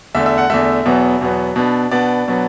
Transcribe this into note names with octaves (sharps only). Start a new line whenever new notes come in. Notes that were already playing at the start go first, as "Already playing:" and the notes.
E2 D3 A3 E5
E5
F#5
E2 D3 A3 E5
E2 B2 F#3 B3
E2 B2 F#3 B3
B2 B3 D4
B2 B3 D4 D5
B2 F#3 B3 D4